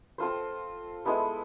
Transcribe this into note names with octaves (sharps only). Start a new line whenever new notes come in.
C4 F4 A4 C5
G#3 B3 E4 A4